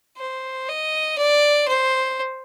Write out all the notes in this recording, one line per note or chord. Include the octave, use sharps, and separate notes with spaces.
C5
D#5
D5
C5